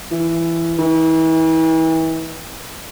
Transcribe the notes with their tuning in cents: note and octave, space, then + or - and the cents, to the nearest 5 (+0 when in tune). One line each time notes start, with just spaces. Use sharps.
E3 +15
E3 -35